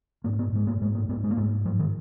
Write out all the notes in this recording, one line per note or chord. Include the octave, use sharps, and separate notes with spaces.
G#2 A#3
D4
B3
G#2 G#3
A#3
G#2 G#3
A#3
G#2 B3
G#3
A#3
G#2 G#3
G#2 F3
D#3